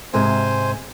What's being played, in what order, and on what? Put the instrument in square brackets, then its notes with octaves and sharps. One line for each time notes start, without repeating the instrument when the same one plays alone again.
[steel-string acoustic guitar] G#2 C3 G#3 [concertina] C5 G#5